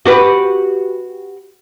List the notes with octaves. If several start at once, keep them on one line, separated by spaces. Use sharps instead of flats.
F#4 G4 B4